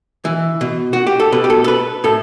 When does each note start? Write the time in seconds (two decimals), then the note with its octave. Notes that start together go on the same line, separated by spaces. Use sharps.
0.25 E3
0.61 B2
0.93 F#4
1.07 G4
1.20 A4
1.32 B2 B4
1.44 G4
1.50 A4
1.64 A4
1.68 B4
2.04 A2 A4